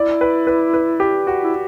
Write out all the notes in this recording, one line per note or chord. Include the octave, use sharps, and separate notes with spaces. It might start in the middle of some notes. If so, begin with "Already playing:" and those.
Already playing: E4 D5
B4
B4
B4
G4
F#4
E4